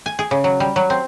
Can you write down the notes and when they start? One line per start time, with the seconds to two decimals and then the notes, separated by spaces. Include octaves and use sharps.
0.06 G#5
0.19 G#4
0.31 C#3
0.44 F#3
0.60 G3
0.76 F#3
0.90 C4